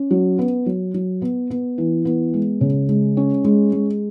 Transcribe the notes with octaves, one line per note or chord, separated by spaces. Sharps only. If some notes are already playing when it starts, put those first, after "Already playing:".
Already playing: C#4
F#3
B3
F#3
F#3
B3
B3
E3
B3
G#3
C#3
G#3
C#4
G#3
G#3